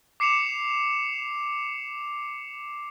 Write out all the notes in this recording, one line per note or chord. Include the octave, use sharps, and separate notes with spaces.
D6 C7 C#7 E7 F7